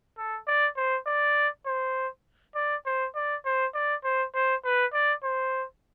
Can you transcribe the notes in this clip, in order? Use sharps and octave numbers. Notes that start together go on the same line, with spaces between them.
A4
D5
C5
D5
C5
D5
C5
D5
C5
D5
C5
C5
B4
D5
C5